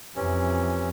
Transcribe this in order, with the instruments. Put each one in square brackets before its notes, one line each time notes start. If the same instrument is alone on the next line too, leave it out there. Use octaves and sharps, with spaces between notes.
[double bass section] F2 [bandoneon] C3 E3 C#4